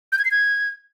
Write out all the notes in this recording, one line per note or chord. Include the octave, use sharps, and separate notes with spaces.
G6
G#6
C7
G#6